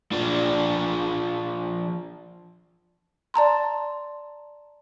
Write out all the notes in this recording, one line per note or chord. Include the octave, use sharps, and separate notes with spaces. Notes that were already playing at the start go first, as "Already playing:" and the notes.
F3 D4
D5 A5 A#5 C6